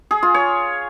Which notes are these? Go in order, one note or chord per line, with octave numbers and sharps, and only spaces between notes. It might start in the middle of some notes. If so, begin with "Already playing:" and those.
G#4
F4
C#5